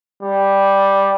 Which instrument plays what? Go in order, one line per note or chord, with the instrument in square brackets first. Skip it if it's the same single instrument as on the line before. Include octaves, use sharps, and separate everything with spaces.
[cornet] G3